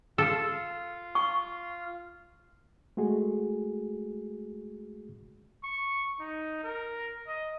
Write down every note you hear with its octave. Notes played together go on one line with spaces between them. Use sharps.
F4 A4
C#6
G#3 A3 F#4 G#4
C#6
D#4
A#4
D#5